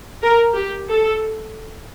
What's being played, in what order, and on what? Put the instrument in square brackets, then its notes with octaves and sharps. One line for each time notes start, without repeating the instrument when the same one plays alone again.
[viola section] A#4
G4
A4